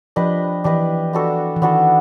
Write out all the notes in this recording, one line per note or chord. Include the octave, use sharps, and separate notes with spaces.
F3 D4 G4 B4 D#5
E3 D4 G4 B4 D#5
B3 D4 F#4 A4
E3
D#3 B3 D4 F#4 A4